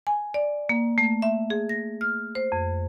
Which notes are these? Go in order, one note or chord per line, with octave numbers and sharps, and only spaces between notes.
G#5
D5
A#3
A3
E5
G#4
A#6
F6
C5
F2